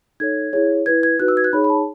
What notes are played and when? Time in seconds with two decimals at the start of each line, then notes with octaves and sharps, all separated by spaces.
0.20 D#4 A4 C#5 G#6
0.53 E4 G#4 C#5
0.86 E4 B4 G#6
1.03 G#6
1.20 D#4 F#4 B4 F#6
1.28 E6
1.37 G#6
1.44 F#6
1.53 D#4 G#4 C#5 B5
1.64 B5
1.70 A5